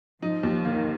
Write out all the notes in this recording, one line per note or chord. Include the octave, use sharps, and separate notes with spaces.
F3 D#4
D#2
D#3 A#3